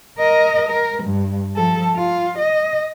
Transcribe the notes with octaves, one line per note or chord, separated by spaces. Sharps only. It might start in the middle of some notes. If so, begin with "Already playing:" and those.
A#4 D#5
A#4
G2
F3 A4
F4
D#5